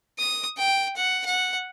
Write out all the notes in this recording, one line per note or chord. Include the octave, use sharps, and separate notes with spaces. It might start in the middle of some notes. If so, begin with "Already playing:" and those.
D#6
G5
F#5
F#5